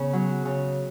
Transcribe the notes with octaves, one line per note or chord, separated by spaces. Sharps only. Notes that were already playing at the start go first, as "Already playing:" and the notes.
Already playing: C#3 B3
F#3
C#3